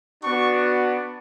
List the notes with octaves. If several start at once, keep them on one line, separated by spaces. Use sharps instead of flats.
B3 D4 F#4 C#6